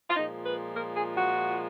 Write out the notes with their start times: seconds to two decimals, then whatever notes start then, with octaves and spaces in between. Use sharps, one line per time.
0.09 F4
0.16 A#2 F3 G#3 D#4
0.45 B4
0.76 A#4
0.96 G#4
1.15 F#4